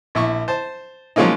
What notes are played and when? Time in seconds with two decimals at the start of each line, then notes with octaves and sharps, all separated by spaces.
0.15 A#1 E4 C#6
0.48 C5 A5
1.16 F3 F#3 G#3 A#3 C#4 D#4